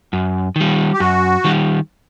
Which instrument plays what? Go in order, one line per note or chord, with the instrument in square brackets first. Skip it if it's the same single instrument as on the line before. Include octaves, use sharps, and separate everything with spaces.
[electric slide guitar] F#2
D#3 G3
[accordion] G4
[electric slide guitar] F#2 [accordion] F#4
[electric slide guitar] D#3 G3